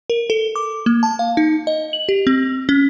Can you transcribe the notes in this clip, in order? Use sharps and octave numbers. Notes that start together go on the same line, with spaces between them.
A#4
A4
D6
A#3
A5
F5
D#4
D#5
F#7
G4
C4
C#4